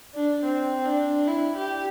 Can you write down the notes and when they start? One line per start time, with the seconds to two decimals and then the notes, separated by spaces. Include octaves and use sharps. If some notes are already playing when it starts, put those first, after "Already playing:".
0.15 D4
0.44 C4
0.85 D4
1.27 E4
1.56 G4